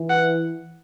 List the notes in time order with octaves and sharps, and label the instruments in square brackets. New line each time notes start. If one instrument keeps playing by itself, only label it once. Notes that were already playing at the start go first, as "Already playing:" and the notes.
Already playing: [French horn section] E3
[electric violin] F#5